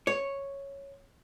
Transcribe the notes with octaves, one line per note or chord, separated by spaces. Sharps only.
C#5